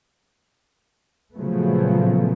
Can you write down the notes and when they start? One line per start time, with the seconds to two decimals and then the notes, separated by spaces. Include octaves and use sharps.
1.35 A#2 C#3 F3 F#3 A3 B3